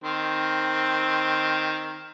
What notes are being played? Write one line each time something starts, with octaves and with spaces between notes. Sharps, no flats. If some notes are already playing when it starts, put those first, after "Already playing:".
D#3 C4